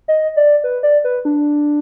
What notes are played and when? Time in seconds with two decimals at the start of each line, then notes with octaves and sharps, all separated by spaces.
0.08 D#5
0.37 D5
0.64 B4
0.83 D5
1.04 B4
1.25 D4